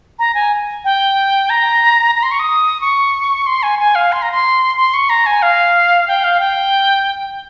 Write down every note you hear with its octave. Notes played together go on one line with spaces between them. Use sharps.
A#5
G#5
G5
A#5
A#5
C6
C#6
D#6
C#6
C6
G#5
G#5
F5
C6
A#5
C6
C6
C#6
A#5
G#5
F5
G5
F5
G5